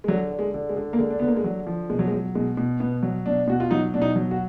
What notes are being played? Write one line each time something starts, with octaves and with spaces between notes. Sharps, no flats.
G#3
D3 F#3
D3
G#3
D3
G#3
D3
A#3
D3 G#3
D4
D3 B3
A#3
G#3
D3 F#3
F3
B2 G#3
F#3
G#3
F#3
B2 G#3
B2
B2 B3
F#3
B2 D4
B2 F#4
F4
F#3 D#4
B2 D4
D#4
F#3
F#4